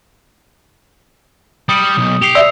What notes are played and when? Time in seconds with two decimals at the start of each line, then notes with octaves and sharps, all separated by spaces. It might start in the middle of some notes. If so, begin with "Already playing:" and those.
1.69 G3 D#6 C#7 F#7
1.98 B1
2.22 G4 C7 C#7 F7
2.35 D5 E5 E6